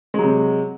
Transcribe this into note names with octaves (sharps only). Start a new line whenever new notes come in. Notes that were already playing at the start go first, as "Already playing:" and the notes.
C3 F#3 G#3